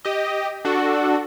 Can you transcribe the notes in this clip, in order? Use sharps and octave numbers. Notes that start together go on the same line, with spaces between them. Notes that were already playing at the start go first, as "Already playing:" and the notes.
G4 D#5
D4 F#4 A4